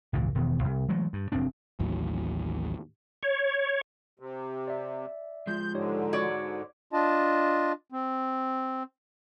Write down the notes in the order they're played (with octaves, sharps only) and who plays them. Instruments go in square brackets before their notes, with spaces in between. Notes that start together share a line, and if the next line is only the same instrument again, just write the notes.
[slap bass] G#1 C#2 A#2 E3
E1 B2 D#3 E3
C2
E3 F#3 G#3 A3
G2
F1 F#2 C4 D4
[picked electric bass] A1 D#2 A2 F#3
[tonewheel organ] C#5
[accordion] C3
[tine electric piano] D5 E5
[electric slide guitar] F3 G#3 [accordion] G6
[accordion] G#2 D3 [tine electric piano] D#4 G4 C#5
[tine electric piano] F#4 [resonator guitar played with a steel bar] C#5 D5
[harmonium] D4 F4 D#5 A5
C4